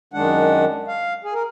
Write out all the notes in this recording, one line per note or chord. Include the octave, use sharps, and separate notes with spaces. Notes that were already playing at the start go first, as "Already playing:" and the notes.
F#2 D#3 G#3 D4 F#5
F5
G#4
A#4